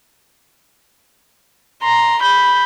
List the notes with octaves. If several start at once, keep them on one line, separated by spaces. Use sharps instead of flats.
A#5 C6
B5 G6